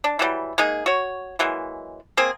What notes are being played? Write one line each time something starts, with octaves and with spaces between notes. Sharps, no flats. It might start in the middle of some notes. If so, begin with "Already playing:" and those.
D4
E3 F#3 G3
G#3 A#3 D#4 G#4
F#4 C#5
E3 F#3 G#3 A#3
A#3 C4 G#4